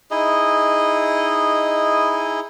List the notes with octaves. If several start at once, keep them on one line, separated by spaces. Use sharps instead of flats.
D#4 E4 G#4 D#5